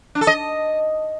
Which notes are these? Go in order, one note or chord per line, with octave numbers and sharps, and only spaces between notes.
D4
A4
D#5